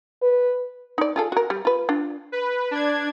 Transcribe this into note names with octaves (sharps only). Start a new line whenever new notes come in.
B4
D#4 D5
F4 G#4 A4
F#4 A#4
G3
F4 B4
D4 F4
B4
D4 G#6